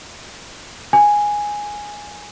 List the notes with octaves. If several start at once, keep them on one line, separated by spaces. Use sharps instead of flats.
G#5